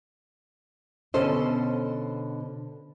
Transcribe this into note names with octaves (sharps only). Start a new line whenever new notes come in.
B2 D3 C#4 A4 C5 D#5